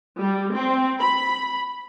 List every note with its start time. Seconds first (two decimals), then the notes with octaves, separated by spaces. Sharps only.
0.20 G3
0.54 C4
0.99 B5